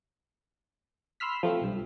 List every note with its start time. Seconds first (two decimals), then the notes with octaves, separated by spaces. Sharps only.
1.20 B5 C6 E6 F6 B6
1.43 F3 A3 C4
1.61 B1 G2